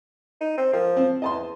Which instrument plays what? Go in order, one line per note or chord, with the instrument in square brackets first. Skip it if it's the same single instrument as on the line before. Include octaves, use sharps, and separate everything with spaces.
[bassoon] D#4
C4
[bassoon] F3 [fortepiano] A#4
[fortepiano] C4
[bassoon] E2 [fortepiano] D#5 A5 C6